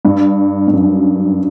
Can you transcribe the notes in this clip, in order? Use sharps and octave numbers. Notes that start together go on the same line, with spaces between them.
G2
G2
F#2